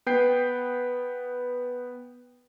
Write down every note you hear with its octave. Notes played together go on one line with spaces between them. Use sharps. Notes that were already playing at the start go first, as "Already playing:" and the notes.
B3 B4 G5 G6 C7